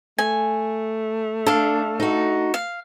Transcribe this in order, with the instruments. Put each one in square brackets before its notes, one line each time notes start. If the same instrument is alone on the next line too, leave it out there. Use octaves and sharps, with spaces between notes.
[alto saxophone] A3 [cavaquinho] G#5
[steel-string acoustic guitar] D4 [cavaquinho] A4 F5
[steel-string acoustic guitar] D#4 F#4
[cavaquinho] F5